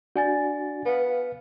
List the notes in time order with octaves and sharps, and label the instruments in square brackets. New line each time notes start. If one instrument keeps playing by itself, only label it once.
[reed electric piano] D4 F#4 [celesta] D5 G#5 A6
[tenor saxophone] B3 [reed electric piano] B4 F5